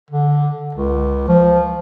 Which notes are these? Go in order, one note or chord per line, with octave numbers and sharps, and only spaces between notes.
D3
C#2
F3